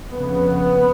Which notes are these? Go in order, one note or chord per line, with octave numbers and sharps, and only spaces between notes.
F2 C#3 B3